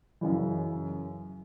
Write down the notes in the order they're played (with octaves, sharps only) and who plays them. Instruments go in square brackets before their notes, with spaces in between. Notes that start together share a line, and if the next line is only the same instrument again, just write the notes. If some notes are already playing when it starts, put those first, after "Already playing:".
[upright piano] F#2 C#3 E3